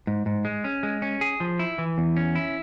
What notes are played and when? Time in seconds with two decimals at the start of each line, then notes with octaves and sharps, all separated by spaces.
0.07 G#2
0.26 G#2
0.45 G#3
0.64 C#4
0.83 G#3
1.02 C#4
1.21 G#4
1.40 F3
1.59 E4
1.78 E3
1.98 E2
2.17 C#4
2.35 E4